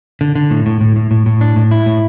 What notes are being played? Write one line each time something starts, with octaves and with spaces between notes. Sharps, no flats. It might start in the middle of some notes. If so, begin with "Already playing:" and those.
D3
D3
A2
A2
A2
A2
A2
A2
D4
A2
E4
A2